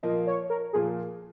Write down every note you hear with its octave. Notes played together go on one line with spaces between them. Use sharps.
A#2 F3 A#3 F4 D#5
C#5
A#4
A#2 F3 A#3 F4 G#4